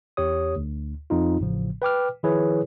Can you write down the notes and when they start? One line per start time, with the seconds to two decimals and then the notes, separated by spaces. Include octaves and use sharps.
0.17 E2 G4 C#5 D#6
0.56 D2
1.10 F2 D#4 F4
1.39 A1 A2 C#3 F3
1.82 B4 G5 D6 F6
2.23 D#3 F3 E4 G#4 B4 C#5